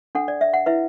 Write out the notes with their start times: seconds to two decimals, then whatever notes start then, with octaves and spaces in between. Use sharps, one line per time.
0.15 D4 A4 F#5
0.28 D5
0.41 E5
0.54 F#5
0.66 E4 B4 E5